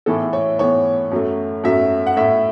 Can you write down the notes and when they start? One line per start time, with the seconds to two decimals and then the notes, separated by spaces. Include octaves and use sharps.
0.06 A2 E3 B3 A4
0.33 C#5
0.59 A2 E3 B3 C#5
1.11 F#2 F#3 A3
1.64 F#2 F#3 A3 E5
2.07 F#5
2.17 A2 A3 E5